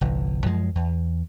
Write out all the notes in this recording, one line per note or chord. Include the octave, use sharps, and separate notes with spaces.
G1 C2 E3
F#2 F3 G#3
E2